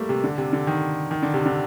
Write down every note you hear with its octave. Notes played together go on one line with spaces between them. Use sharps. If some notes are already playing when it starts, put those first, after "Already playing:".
Already playing: G3 A3 A#3
C3
D3
C3
D3
D#3
D#3
D3
C3
D3